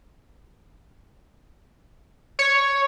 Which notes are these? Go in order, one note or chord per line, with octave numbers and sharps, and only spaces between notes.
C#5